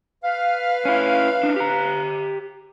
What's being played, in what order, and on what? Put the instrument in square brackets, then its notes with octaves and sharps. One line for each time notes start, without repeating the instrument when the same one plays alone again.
[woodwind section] B4 F5
[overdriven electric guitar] C#4 E4
D4 D#4
G4 A#5